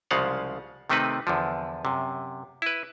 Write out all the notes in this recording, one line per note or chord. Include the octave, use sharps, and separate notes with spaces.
C2 C#3 F3 G#3 F5 F#5
C3 D#3 A3 C4 D#4 B4
E2 D3 F3
F#2 C3
E4 B4